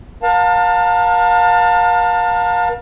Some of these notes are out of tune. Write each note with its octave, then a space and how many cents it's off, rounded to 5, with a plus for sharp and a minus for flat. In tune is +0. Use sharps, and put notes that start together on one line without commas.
A#4 +40 F5 +30 A5 +30